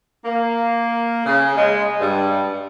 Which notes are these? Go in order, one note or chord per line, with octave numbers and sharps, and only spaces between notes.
A#3
C#3
G#3
G2